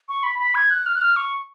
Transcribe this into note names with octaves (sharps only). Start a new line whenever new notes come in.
C#6
B5
B5
G#6
F#6
F6
F#6
F6
C#6